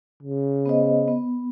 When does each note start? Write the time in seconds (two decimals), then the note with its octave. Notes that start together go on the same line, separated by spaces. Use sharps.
0.23 C#3
0.66 B3 C5 D#5
1.08 B3